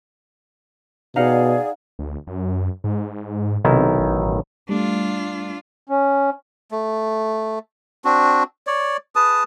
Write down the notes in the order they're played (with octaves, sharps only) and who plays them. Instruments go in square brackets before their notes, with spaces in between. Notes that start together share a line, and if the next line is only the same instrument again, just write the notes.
[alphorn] B2 [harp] D#4 F5 F#5 [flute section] G#4 D5
[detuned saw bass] D2
F#2
G#2
[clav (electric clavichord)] B1 D#3 E4 [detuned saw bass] C3
[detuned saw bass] A1
[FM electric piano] G3 A3 [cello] D4 F4
[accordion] C#4
[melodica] A3
C4 D4 F#4
C#5 D5
G#4 B4 A5 D#6